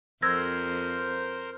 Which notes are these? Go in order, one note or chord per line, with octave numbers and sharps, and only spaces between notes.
F2 A#4 C5 E6 G#6 A#6